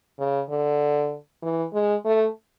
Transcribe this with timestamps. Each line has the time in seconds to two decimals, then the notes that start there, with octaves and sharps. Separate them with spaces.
0.19 C#3
0.50 D3
1.43 E3
1.73 G#3
2.05 A3